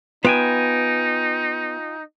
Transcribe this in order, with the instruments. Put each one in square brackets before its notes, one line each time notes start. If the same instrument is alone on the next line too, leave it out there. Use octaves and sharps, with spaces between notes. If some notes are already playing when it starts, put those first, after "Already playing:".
[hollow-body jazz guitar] B3 [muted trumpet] D#4 [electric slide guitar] F4 G5 G#5